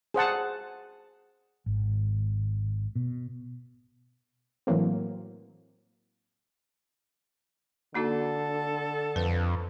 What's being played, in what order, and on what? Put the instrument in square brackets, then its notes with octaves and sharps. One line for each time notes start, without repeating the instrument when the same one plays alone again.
[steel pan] G#4 C5 F#5 A5
[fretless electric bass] G#1
B2
[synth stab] A2 E3 F#3 A#3 C4
[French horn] D3 [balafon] A#3 D#4 F#4 [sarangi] A4
[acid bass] F2 [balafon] B4